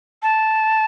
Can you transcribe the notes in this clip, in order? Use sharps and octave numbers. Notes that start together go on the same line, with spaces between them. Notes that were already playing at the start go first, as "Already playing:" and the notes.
A5